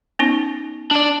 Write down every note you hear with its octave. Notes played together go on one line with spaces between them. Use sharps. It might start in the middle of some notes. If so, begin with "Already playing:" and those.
B3 C#4 D#4
D4 D5